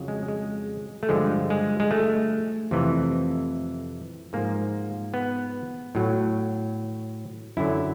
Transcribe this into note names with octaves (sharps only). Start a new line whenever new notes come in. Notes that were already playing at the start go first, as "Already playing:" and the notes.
Already playing: F2 C#3 F#3
G#3
G#3
A3
G2 D3 F3 G#3
G#3
G#3
A3
F2 C3 E3
G#2 F3 A#3
B3
A2 F#3
F#2 D3 F#3 E4